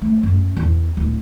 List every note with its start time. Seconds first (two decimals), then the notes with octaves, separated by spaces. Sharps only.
0.02 A3
0.23 F#2
0.57 E2
0.97 D1